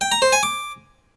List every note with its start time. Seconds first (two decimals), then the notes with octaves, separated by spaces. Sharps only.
0.01 G5
0.12 A#5
0.22 C5
0.32 G#5
0.43 D6